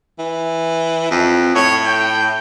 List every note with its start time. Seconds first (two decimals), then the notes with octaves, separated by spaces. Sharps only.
0.19 E3
1.11 F2
1.55 A2 C#5
1.85 G5